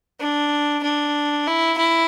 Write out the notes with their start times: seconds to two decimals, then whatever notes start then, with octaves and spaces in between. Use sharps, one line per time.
0.21 D4
0.83 D4
1.47 E4
1.78 E4